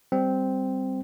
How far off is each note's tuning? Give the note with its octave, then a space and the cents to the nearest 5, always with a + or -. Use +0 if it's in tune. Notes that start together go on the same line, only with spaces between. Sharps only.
G3 +0 C4 -5